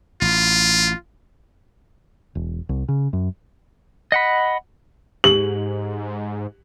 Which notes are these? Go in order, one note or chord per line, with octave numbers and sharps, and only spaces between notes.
A1 F4
E1
C2
C#3
F#2
D#5 F#5 B5
G#2 G4 F#7